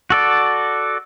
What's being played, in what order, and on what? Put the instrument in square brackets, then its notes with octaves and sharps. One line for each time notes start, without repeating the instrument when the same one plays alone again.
[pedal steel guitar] F#4 A4 D5